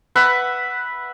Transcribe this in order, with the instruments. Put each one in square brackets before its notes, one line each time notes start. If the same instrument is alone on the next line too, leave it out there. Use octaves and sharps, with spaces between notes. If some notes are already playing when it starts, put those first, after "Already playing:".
[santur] B4 E5 F#5 B5